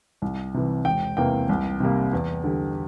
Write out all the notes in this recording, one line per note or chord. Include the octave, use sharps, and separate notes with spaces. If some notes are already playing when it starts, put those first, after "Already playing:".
C2
C3 E3
E1 G5
E2 C3 E3 A#3 G5
C2
C3 G3 A#3
E2
D3 G3